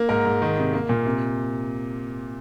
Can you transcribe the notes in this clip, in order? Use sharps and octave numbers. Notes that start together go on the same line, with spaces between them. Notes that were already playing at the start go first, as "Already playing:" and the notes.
Already playing: A#3
G#2 A#4
G#2
D#3
C3
A#3
A#2
C3